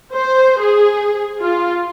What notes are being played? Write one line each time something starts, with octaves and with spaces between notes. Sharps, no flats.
C5
G#4
F4